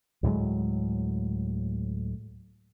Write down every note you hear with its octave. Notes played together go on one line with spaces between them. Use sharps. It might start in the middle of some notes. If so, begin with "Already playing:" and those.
D2 A2 F#3 G#3